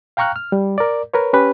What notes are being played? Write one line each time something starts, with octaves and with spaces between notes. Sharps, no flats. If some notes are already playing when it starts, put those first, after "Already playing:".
F5 G5 A#5 C#6 F6 F#6
F6
G3
A#4 D5
A#4 B4 C#5
C#4 G4 B4